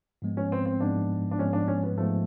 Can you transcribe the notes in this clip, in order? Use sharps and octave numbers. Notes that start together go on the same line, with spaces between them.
G#2 F3 G#3 B3
C#4
C4
C4
G#2 F3 G#3 B3 D4
D4
G#2 F3 G#3 B3 C#4
D4
C#4
B3
G#2 F3 G#3 A3 B3